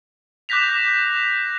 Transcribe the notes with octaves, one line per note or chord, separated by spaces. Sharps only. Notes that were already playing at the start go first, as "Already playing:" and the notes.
D6 F#6 G6 A#6 B6 F7